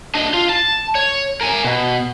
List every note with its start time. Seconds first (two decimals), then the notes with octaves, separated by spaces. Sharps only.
0.15 D4 D#5
0.34 F4
0.49 A5
0.95 C#5
1.41 A#4 G#5
1.64 B2